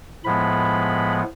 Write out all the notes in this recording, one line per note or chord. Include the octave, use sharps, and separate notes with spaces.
A2 F3 G#3 B3 B5